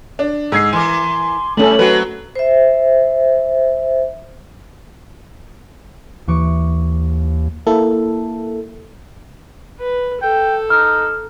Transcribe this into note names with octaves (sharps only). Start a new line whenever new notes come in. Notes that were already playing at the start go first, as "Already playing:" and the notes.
D4
G#2 E6 G#6 C7
E3 A#4 G#5 C6 D6
A2 G3 A3 C#4 A4 F#7
F#3 C4 F#4 B4
C5 E5
D#2 E3 C#6 D6
A#3 E4 A4
B4
A4 G5
D#4 F6